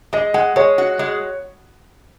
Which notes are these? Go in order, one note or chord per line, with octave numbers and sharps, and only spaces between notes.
G#3 D#5
G#3 F#5
G#3 C#5
F#4
G#3